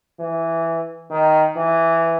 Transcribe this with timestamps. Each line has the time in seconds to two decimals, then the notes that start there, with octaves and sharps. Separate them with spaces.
0.19 E3
1.10 D#3
1.56 E3